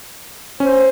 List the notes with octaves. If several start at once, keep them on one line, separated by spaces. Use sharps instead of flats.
C#4 C5